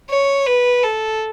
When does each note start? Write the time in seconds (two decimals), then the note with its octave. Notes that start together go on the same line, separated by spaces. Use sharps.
0.10 C#5
0.46 B4
0.83 A4